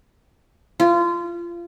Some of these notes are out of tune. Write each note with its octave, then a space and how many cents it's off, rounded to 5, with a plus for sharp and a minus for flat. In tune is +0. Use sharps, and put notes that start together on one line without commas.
F4 -25